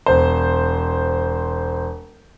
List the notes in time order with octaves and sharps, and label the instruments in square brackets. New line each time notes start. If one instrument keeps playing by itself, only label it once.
[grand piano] E1 C5